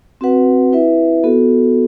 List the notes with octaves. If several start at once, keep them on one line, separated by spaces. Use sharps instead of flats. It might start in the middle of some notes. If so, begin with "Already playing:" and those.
C4 F#4 B4 F#5
E4 B4 E5
B3 F#4 A4